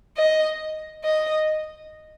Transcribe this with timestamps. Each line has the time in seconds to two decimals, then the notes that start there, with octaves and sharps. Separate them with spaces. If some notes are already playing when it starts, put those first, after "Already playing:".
0.17 D#5
1.04 D#5